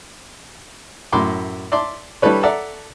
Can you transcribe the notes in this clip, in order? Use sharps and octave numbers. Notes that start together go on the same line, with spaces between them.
F#2 A2 B5 C6 D6
D5 E5 A5 C6 D6
G3 D4 E4 A4 B4 C#5
A4 D5 E5 F#5 A5 A#5